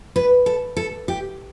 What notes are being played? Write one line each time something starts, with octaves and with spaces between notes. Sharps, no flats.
B4
A4
A4
G4